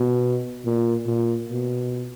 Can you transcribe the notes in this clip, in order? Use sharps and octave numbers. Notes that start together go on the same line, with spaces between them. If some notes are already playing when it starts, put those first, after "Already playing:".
Already playing: B2
A#2
A#2
B2